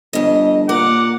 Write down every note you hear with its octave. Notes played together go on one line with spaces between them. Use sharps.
G1 F2 D#5
A#2 A#4 F#5 D6